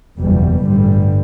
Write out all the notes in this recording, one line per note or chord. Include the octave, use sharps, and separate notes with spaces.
F#1 E2 B2 G3
A1 G2 D3 G3